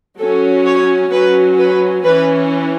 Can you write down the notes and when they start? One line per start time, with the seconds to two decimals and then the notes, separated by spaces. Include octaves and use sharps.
0.19 F#3 C#4 A4
0.65 C#5
1.12 F#3 C#4 B4
1.59 B4
2.05 E3 C#4 B4